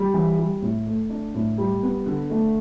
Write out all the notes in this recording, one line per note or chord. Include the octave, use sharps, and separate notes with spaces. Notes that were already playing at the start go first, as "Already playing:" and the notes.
Already playing: G3
E3
G3
A2
A3
D4
A2
G3
B3
D3
A3